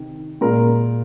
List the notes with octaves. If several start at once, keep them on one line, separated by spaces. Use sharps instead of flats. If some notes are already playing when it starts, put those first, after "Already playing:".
Already playing: C3 D#3
A#2 G#3 A#4